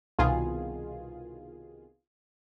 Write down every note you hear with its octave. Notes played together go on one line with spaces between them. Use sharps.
C2 B2 D#3 F4 G#4